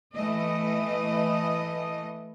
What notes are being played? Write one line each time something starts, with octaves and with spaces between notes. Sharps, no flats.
E3 A3 D#5